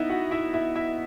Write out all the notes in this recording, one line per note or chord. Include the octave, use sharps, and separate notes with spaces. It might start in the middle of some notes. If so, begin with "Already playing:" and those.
Already playing: B3 D#4 E4 D#5 E5
F#4 F#5
E4 E5
E4 E5
E4 E5